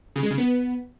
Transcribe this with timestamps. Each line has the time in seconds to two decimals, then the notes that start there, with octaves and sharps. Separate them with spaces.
0.16 C#3
0.23 G#3
0.31 C#3
0.38 B3